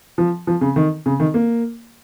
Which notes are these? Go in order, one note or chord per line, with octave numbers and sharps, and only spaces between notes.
F3
F3
C#3
D#3
C#3
D#3
A#3